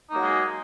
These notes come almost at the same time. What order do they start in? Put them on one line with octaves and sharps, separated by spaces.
D#4 A#3 F#3 G#3 G#4